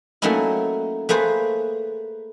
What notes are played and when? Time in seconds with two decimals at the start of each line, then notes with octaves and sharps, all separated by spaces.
0.22 F#3 A3 A#3 C#4 D#4 E4
1.09 A3 A#3 G#4 B4 C5